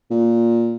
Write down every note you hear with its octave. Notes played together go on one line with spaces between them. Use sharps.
A#2